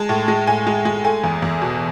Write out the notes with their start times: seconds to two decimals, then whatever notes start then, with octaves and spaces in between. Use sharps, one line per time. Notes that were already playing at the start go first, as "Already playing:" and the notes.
Already playing: G#3 A5
0.09 A2
0.28 G#3
0.47 A2 G#5
0.67 G#3
0.85 G#3
1.05 A3 G#5
1.24 E2
1.42 E2
1.61 B2